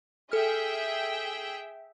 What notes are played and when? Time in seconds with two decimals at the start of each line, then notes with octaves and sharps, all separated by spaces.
0.32 G#4 A4 E5 G5 F6